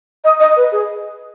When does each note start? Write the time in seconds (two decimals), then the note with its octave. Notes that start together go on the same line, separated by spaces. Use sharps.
0.24 D#5
0.40 D#5
0.56 B4
0.72 G#4